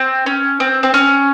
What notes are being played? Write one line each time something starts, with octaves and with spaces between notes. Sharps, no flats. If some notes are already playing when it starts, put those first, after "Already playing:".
Already playing: C4
C#4
C4
C4
C#4